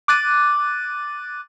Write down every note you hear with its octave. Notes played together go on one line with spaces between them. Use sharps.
D6 F#6 A6 D#7